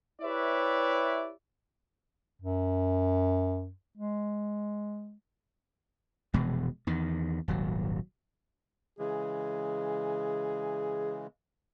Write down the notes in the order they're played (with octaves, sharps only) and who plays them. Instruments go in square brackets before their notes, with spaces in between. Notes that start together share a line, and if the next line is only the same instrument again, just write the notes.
[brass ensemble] E4 G4 B4 C#5 D5 E5
[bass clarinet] F#2
G#3
[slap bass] F1 B2 E3 G#3
E2 D#3
D#1 G#1 F#3
[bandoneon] C#3 E3 G#3 [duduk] G#4